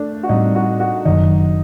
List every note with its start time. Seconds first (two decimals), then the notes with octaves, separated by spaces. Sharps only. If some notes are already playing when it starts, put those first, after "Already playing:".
Already playing: A3 D4
0.23 F#4
0.29 A2 G3 C4 D#4
0.55 F#4
0.80 F#4
1.05 F#1 F#2 D#3 D#4